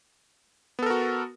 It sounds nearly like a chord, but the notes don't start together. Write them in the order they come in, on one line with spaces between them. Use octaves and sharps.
B3 A4 A#4 F#4